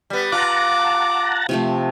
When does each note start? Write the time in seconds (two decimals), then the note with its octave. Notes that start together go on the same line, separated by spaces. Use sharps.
0.10 G3 B3
0.32 F4 F#5 A5 A#5 D6
1.49 C3 F3 A3